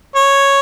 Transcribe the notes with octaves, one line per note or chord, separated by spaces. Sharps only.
C#5